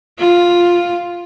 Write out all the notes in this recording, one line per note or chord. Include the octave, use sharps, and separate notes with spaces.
F4